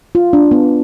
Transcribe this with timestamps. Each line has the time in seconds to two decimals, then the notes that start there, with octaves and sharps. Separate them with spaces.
0.15 F4
0.33 D4
0.51 B3